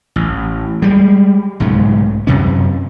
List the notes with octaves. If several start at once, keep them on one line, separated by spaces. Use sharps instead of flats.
A1
G3 G#3
B1 G#2 C#3 A3
F#2 C3 C#4